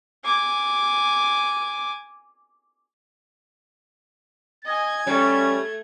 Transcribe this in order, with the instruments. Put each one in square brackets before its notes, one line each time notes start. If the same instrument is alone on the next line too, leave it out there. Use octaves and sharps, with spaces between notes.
[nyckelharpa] G#5 D6
[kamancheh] D#5 G#5 [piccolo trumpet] G#6
[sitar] G3 C#5 [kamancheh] A3 [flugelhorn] C#4